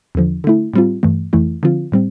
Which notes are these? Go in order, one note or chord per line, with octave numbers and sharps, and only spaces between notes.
E2 D3 F3
D3 A3 E4
A2 G3 C4 F4
G2 E3 A3
F2 E3 A3 E4
D3 F3 C4 F4
A2 G3 C4